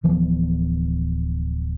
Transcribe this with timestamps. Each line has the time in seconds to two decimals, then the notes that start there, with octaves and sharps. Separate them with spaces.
0.04 D1 E3 F3 B3